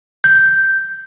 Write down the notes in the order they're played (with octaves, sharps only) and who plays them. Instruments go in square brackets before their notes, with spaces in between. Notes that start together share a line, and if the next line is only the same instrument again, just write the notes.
[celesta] G6